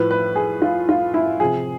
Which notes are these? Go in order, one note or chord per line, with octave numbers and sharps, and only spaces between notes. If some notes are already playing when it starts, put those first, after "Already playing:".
Already playing: A2 F3 B4
B4
G#4
F4
F4
E4
C3 F3 G#4